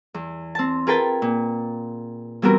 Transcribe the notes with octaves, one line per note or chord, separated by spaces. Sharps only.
E2
C4 A5
F4 G#4 A#4 B4 G5 A5
A#2
E3 G3 B3 C4 F#4 A#4